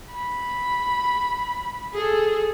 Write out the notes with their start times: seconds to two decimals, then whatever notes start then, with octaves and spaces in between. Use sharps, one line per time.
0.12 B5
1.93 G#4 A4